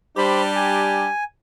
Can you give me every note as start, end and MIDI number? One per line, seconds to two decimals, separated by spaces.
0.17 1.10 55
0.17 1.10 62
0.17 1.10 67
0.17 0.42 72
0.17 0.42 83
0.56 1.24 80